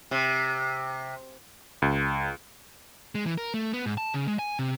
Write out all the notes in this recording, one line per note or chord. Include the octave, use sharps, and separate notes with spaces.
C3
C#2
G#3
E3
A#4
A3
B3
G#2
A5
C#3
G#3
G#5
C3